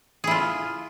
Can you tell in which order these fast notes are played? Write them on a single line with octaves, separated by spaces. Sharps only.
G#4 E4 F4